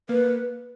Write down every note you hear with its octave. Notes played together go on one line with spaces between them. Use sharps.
A#3 B4